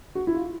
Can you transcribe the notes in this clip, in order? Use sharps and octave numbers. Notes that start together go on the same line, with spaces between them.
F#4
E4
F4